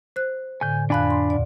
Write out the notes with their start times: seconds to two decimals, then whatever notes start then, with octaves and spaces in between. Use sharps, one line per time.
0.16 C5 F#6
0.61 A2 D3 G#5 G6
0.90 F2 D4 F5 G#5 B5 F#6
1.10 C6
1.30 D2 A#2 D5